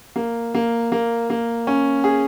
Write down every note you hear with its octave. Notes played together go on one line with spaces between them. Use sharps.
A#3
A#3
A#3
A#3
C#4
G#4